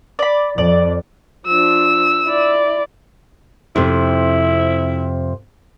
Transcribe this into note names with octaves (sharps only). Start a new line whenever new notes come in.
D5 B5
F2 D5
F3 D4 E6
E4 D5
F2 C3 E4